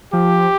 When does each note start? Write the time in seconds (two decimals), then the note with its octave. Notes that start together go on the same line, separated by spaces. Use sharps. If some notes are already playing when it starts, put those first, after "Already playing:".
0.13 F3 G4